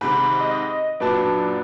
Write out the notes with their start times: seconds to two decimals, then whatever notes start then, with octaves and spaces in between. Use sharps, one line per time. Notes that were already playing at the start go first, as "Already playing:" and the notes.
0.01 G#2 C3 D#3 B5
0.40 D#5
1.00 F#2 A#2 F#3 D4 B4 A5